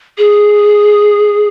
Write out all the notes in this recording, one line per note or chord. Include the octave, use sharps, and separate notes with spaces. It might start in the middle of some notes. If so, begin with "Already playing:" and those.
G#4